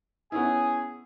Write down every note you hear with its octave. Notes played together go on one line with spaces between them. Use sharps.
B3 C#4 E4 G#4 G#5